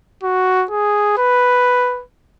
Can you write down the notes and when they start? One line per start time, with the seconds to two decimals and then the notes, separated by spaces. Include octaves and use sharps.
0.23 F#4
0.71 G#4
1.18 B4